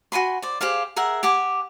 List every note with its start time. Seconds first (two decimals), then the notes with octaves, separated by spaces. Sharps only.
0.12 F#4 G#5 B5 C6
0.42 C5 D5
0.61 G4 G#4 C5 F5
0.96 G#4 A#4 E5 F#5
1.23 G4 F#5 G#5 D6